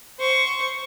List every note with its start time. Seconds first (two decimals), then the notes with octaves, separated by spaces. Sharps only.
0.19 C5 C#6